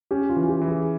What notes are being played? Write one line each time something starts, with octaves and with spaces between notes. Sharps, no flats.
C#4 G4
F4
E3
G4
E3
G#4